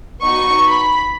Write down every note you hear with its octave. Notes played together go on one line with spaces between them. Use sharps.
B3 D#4 F#4 C#6
B5